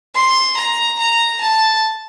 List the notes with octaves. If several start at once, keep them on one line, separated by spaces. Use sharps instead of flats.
C6
A#5
A#5
A5